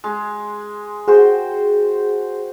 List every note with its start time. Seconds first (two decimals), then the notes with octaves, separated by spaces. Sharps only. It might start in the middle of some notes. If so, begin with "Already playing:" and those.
0.04 G#3
1.08 F#4 G#4 C5 G5